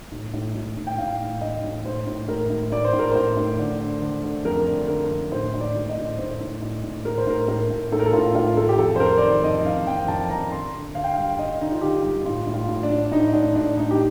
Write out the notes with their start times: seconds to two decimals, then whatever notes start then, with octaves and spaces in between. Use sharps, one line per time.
0.12 A2
0.34 A2
0.55 A2
0.77 A2
0.87 G5
0.98 A2 F5
1.20 A2
1.41 A2 D#5
1.64 A2
1.85 A2 C5
2.07 A2
2.28 A2 A#4
2.50 A2
2.72 A2 D5
2.85 C5
2.93 A2
2.99 A#4
3.12 A2 C5
3.37 A2
3.59 D3
3.80 D3
4.02 D3
4.23 D3
4.45 F2 A#4
4.67 D3
4.88 D3 A#4
5.10 F2
5.32 A2 C5
5.54 A2
5.61 D5
5.76 A2
5.89 D#5
5.97 A2
6.18 A2 C5
6.40 A2
6.62 A2
6.84 A2
7.05 A2 A#4
7.18 C5
7.27 A2 A#4
7.48 A2 A#4
7.70 A2
7.92 A2 A4
8.00 A#4
8.06 A4
8.13 A2 F4
8.35 A2 F4
8.57 A2 A4
8.69 G4
8.79 F2 A4
8.96 C5
9.00 F2 A#4
9.18 D5
9.22 D#3 C5
9.43 F2 D#5
9.65 F2 F5
9.87 F2 G5
10.08 F2 A5
10.30 F2 A#5
10.52 D3 C6
10.73 D3
10.95 D3 F5
11.04 G5
11.14 G2 F5
11.38 D3 D#5
11.60 D3 D#4
11.71 F4
11.81 D3 G4
12.04 G2
12.25 A2 F4
12.47 A2
12.54 F4
12.68 A2
12.83 D4
12.90 A2
13.12 A2 D#4
13.33 A2 D4
13.55 A2 D4
13.77 A2 D#4
13.91 G4